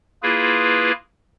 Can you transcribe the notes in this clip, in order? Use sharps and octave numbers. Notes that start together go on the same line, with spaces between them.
A#3 E4 F4 G#4 B4